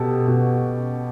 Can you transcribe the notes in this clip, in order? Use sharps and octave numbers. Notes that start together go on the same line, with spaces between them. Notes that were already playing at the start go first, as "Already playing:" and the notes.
Already playing: B2 G4 A4
B2 F#4